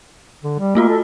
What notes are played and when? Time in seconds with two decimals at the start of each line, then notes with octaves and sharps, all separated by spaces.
0.44 D3
0.59 G3
0.75 A3 A#3 F4 F#4
0.88 A4